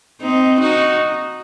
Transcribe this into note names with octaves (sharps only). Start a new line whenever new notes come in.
C4 D#4
D#4 F#4